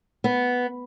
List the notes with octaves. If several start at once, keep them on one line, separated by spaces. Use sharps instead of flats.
B3